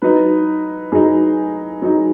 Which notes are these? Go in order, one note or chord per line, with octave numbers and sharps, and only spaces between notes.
F#3 D#4 B4
F#3 D#4 G#4
F#3 D#4